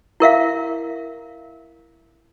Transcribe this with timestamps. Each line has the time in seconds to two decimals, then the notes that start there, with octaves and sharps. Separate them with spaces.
0.20 E4 A#4 E5 F5